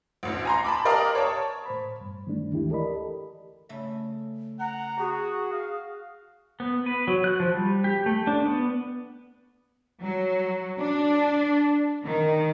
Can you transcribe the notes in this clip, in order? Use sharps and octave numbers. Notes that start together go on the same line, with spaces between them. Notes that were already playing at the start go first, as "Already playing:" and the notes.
A1 D2
G#5 A#5 C6
A5 B5 D6
G4 A#4 D5 D#5 F5 A#5
C#5 A5
A2 C5 B5
G2
G2 D#3 G#3 A3 D4
D2 E3 E4 G4
G4 A4 A#4 D5 D#5 B5
C#3 A3 E5
F#5 A#5
F#4 G#4
F5
B3
B4
F#3
F#6
F3
G3
G4
A3
D4
B3
F#3
D4
D#3